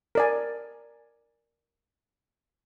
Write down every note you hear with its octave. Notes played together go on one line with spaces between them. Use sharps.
A#4 D5 G#5